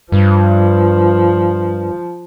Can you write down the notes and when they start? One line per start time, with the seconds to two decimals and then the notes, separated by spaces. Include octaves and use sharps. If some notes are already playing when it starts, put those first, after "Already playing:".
0.12 G2 F3